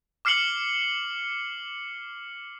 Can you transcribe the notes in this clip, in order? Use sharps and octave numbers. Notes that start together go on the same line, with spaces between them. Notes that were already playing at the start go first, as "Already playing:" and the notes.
D6 F6 C7 C#7 F#7 G7